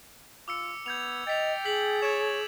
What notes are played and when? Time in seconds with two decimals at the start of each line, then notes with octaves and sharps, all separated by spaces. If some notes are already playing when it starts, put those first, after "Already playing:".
0.48 F4 D6 E6 C#7
0.86 B3 G6 G#6 F7
1.27 D#5 G5 A6 B6 F7
1.65 G#4 G6 B6 F#7
2.02 C#5 G#6 D7 E7